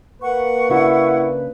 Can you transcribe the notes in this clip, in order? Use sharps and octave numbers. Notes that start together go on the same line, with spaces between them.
A#3 B4 F#5 C#6
C#3 D4 E4 F#4